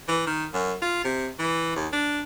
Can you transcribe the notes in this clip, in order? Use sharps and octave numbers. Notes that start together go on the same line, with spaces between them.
E3
D#3
F#2
F4
C3
E3
D#2
D4